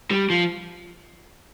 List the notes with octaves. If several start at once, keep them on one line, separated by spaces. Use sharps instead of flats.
G3
F3